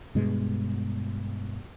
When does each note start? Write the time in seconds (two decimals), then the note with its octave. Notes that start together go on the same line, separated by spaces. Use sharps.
0.15 G2 B2 G#3